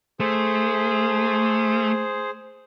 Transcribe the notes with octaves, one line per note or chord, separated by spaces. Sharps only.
A3 G#4 C5